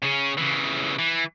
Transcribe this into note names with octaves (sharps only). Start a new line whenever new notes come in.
C#3 C#4
C#3 E3
E3